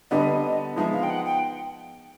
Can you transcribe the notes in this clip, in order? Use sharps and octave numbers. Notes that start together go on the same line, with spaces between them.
D3 G3 B3 D#5
F3 G#3 B3 D#4 E5
F5
G5
F#5
G5